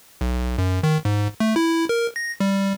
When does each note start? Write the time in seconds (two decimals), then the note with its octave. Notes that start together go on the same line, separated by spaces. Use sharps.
0.21 B1
0.58 F#2
0.83 D#3
1.05 G#2
1.40 A3
1.56 E4
1.89 A#4
2.16 A#6
2.40 G3